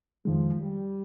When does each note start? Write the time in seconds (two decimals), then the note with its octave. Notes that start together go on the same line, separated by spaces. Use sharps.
0.25 F2 D#3 F3 G#3
0.60 G3